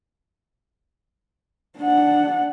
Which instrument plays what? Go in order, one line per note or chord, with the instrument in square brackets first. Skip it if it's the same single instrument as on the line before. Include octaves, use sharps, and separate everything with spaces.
[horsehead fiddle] D4 F#5